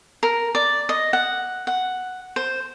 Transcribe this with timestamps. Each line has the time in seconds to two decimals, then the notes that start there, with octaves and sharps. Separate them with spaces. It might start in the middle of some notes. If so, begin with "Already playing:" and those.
0.23 A#4
0.55 D5
0.89 D#5
1.13 F#5
1.67 F#5
2.36 C5